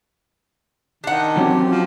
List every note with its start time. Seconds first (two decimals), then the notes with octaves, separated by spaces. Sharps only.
1.04 D#3 D4 F#5
1.37 F#3 C4 C#4 G4
1.70 F3